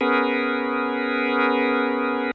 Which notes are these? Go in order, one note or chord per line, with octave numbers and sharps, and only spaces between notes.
B3 C#4 G#4 A#4 B4